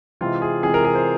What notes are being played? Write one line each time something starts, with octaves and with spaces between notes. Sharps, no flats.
C3 E3 G#3 C4 F4
G#4
C3 E3 G#3 C4 G#4
A#4
G#4
C5